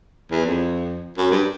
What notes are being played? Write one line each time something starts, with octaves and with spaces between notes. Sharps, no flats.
E2
F2
F#2
G2